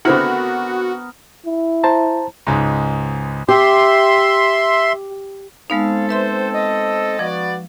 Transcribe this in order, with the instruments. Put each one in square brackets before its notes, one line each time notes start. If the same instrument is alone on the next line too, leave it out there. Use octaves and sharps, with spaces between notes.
[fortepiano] D3 C4 E4 [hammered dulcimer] B3 A#4 [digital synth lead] F#4
[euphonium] E4
[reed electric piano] C5 A5 A#5
[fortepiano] C#2 G#2
[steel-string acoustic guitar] G4 [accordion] E5 C6
[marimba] G#3 B3 D#4 [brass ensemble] C4 A4 [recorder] F5
[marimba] B4 E5 C6 [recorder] C5
[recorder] D#5
[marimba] F3 [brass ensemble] B3 F#4 D5